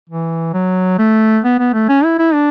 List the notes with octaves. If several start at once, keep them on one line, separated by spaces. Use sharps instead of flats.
E3
F#3
A3
B3
B3
A3
C#4
E4
E4
D4